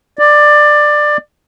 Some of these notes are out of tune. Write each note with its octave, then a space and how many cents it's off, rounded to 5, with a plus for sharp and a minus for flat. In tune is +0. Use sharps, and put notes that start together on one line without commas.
D5 +15